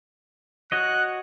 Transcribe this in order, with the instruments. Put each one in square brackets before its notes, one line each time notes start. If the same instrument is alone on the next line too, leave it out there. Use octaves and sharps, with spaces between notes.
[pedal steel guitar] F#4 C#5 D#5 [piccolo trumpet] F#6